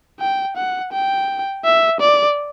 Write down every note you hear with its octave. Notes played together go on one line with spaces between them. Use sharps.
G5
F#5
G5
E5
D5